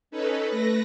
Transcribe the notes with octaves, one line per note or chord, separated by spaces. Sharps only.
C#4 D#4 A4 B4
A3 B4 A#6